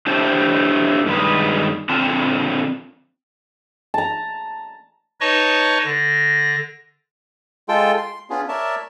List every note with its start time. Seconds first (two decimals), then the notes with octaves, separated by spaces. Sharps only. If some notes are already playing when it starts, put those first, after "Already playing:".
0.06 A3 D4 E4 G4 C5 A5
1.06 G2 D#3 G#3 B4
1.89 D3 C4 F4 A5
3.94 A5 A#5
5.21 D#4 B4 C#5 D#5 A5 C#6
5.85 D3 A#6
7.69 G#3 F4 A4 G5
7.98 C6
8.30 B3 C#4 D4 F4 G#4
8.49 A#4 C#5 D5 E5 A5